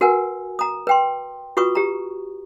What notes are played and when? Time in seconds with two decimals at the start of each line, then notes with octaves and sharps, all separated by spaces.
0.01 F#4 A#4 B4 F#5 G#5
0.59 A#5 D#6
0.87 B4 G5 C6
1.57 F4 F#4 B4 C#6 D#6
1.75 G4 A#5